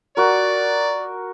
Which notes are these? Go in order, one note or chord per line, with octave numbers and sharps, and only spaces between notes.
F#4 A#4 D5